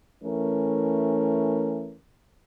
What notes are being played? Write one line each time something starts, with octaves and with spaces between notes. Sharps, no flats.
E3 A3 C#4 A#4